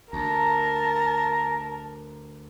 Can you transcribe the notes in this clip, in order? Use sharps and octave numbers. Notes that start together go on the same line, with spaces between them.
D2 A#4 A5 A#5